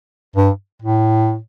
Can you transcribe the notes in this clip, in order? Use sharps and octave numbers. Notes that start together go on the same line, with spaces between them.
G2
A2